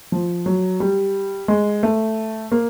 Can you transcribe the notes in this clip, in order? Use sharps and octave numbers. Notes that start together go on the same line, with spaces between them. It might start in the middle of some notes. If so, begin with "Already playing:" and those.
F3
F#3
G3
G#3
A3
A#3